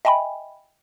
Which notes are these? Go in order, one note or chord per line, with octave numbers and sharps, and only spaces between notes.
D#5 E5 G5 G#5 B5